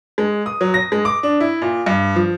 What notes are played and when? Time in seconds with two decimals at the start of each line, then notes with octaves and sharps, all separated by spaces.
0.18 G#3
0.46 D#6
0.61 F#3
0.74 A#6
0.92 G#3
1.05 D6
1.23 D4
1.40 E4
1.62 A#2
1.86 G2
2.16 F3